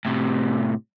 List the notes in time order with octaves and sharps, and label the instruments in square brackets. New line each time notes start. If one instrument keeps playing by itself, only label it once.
[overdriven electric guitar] A2 C3